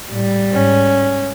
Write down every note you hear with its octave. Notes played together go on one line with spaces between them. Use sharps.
A2 G3
G#2 C#4